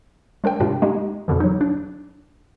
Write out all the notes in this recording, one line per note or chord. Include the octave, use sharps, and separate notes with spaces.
G#3 D4 A#4 G5
G#2 C3 D4 E4 F4
G#3 D#4 G4
F2 B2 D3 E3
F#3 D#4
D4